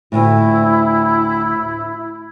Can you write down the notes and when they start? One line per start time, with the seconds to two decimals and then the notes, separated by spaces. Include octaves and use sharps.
0.12 D2 A2 E4